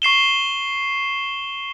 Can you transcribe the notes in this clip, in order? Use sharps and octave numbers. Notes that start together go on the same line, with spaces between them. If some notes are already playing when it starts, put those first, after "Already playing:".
C#6 C7 E7 G7